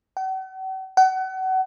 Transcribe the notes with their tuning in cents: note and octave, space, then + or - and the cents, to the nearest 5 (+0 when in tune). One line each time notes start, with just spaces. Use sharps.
F#5 +45
F#5 +30